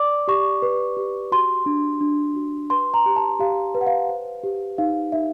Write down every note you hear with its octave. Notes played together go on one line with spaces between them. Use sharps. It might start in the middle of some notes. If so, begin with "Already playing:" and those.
Already playing: D5 D6
G4 C#6
B4
G4
F#4 C6
D4
D4
F#4
B4 C6
A#5
G4
A5
G4 F5
B4
F#5
F5
C5
G4
D#4 F5
D#4 E5